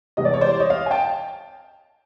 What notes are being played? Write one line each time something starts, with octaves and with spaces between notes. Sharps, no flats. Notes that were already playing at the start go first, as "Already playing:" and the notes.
C2 C3 E3 G#3 B3 D#5
D5
C#5
C5 D5
C#5 D#5
D#5 F5
G#5
G5 A5